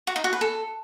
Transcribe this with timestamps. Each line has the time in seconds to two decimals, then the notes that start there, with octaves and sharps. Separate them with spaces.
0.07 F#4
0.16 D#4
0.24 F#4
0.33 B4
0.41 A4